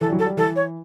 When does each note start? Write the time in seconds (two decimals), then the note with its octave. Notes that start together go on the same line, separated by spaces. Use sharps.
0.01 E3 A4
0.08 G3
0.12 F#3
0.19 A4
0.26 G3
0.37 E3 A4
0.56 C#5